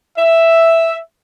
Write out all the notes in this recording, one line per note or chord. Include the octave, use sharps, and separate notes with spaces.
E5